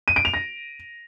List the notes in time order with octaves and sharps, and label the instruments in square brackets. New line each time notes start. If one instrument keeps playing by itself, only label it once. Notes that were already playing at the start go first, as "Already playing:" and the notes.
[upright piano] D#7
D7
F7
A#6